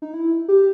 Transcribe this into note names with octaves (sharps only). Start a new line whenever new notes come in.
D#4
E4
G4